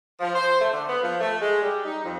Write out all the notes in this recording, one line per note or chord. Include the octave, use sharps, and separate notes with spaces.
F3
C5
A3
D3
B3
F3
A3
G#3
G3
D#4
F2